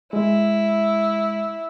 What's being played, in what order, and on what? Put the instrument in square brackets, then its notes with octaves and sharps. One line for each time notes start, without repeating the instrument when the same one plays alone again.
[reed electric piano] G#3 [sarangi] E4